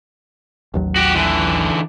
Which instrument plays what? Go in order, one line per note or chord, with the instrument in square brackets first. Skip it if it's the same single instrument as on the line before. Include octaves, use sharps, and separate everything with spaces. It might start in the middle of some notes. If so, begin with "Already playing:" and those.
[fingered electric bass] A1 D#2 F#3
[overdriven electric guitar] F#4 G4
D3 E3